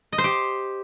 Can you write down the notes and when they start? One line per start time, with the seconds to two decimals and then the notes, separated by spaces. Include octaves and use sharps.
0.12 D#5
0.18 C5
0.24 G4